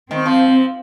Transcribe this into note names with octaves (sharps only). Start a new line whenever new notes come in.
D#3 C4
F3